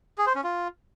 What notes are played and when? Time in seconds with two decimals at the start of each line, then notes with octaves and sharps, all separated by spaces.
0.18 G#4
0.27 C5
0.35 C#4
0.44 F4